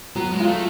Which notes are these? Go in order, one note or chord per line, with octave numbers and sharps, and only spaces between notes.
F#3 B3
G#3
F4
A3